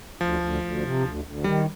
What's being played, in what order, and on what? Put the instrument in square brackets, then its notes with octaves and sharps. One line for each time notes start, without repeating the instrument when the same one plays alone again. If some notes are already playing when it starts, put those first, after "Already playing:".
[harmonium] D2 [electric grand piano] F3
[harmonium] D2
D2
C3
D2
D2
[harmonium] D#3 [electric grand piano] G3